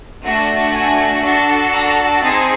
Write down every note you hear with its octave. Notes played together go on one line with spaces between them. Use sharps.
A3 D4 F#4
G#5
D4 F#4 A4
A#5
C4 D#4 G#4 A5